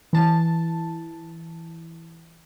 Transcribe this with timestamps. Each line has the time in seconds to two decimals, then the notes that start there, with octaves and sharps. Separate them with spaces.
0.13 E3 A5